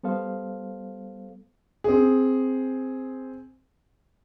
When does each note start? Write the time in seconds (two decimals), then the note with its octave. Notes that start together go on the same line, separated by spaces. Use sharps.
0.03 G3 B3 A4 C5 F5
1.84 C4 G#4